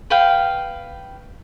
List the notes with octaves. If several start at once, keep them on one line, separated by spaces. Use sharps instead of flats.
B4 F5 G5